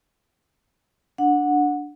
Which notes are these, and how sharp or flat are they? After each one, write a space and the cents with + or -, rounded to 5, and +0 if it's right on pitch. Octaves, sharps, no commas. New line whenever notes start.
D4 +0 F#5 -15